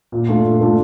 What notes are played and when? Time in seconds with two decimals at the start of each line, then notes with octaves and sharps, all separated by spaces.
0.12 A#2
0.29 A3 D4 F4 A4
0.44 A#2
0.60 A3 D4 F4 A4